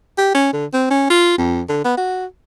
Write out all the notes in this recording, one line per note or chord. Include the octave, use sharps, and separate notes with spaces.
G4
C#4
D3
C4
C#4
F4
F2
D3
B3
F#4